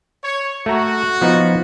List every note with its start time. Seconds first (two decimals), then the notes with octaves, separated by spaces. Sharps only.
0.24 C#5
0.66 A3 F#4 A#5
1.21 F3 B3 D#4